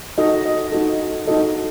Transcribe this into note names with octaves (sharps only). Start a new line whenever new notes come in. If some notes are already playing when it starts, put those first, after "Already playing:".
D#4 F#4 A4 D#5
D#5
D#4 F#4 A4
D#4 F#4 A4 D#5